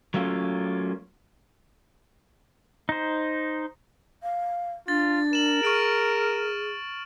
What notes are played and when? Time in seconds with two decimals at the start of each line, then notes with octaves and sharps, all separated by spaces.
0.14 F#3 A3 A#3 C#4 F4
2.89 D#4 C5
4.23 F5
4.88 D4 F4 A6
5.33 A#4 E7 F#7
5.63 G#4 C#6 F6 D7